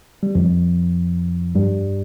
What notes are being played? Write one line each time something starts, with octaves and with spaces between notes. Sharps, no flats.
G3
F2 F3
G2 G3